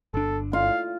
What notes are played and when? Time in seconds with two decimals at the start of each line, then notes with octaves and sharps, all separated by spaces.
0.14 G1 D4 A4
0.53 F4 F5